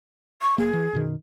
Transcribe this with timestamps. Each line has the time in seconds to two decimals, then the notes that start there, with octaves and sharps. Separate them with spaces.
0.41 C#6
0.58 F#1 A#3 G#4
0.73 E3
0.93 F#2 B2 D#3